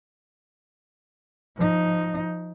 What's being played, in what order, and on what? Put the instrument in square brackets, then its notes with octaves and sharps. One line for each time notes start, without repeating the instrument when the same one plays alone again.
[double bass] F3 D#4